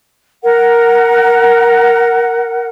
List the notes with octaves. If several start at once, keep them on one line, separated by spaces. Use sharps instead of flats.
A#4 F#5